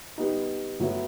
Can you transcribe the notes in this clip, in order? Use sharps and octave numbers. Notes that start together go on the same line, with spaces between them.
G3 B3 D#4
A2 F#3 B3 E4